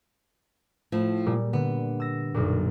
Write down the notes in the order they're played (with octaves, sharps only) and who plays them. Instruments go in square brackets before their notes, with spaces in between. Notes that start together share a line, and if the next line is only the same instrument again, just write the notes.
[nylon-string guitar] A2 F3
[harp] A#2 G3
[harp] D3 [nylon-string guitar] B3
[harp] E6 A#6
B1 F#2 A#2